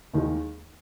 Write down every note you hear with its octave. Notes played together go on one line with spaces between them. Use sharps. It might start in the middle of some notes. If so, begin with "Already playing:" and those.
D#2 D#3 G#3